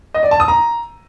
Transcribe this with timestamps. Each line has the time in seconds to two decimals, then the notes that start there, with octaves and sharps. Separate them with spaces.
0.14 D#5
0.23 D5
0.31 A5
0.40 D#6
0.48 A#5